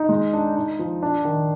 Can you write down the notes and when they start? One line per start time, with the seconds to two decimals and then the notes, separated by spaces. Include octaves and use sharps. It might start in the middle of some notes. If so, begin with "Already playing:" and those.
Already playing: D#4
0.09 G#3
0.33 D4
0.56 D#4
0.79 F3
1.03 D4
1.25 D#3